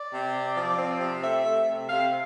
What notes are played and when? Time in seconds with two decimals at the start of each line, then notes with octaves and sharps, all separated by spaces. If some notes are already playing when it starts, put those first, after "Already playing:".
Already playing: D5
0.12 C3
0.34 C4
0.55 F3
0.78 C4
1.00 C3
1.23 A3 E5
1.45 A3
1.68 C3
1.89 C3 F5